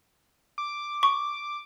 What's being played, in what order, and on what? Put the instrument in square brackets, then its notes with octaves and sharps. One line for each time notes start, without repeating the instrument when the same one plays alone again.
[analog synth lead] D6
[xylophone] C#6